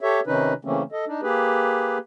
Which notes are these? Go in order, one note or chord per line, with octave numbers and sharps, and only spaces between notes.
G4 A4 C#5 E5
C3 D#3 C#4 D#4 B4
C#3 E3 A3 A#3 C4 C#4
A4 D#5
D4 D#4
A#3 G4 G#4 B4